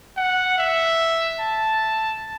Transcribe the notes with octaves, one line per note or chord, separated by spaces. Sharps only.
F#5
E5
A5